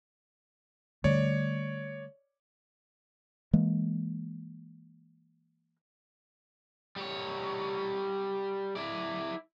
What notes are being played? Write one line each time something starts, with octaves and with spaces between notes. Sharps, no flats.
D3 G3 A3 C#5 D5
E3 G#3 A#3
G3 C#5
E4 D5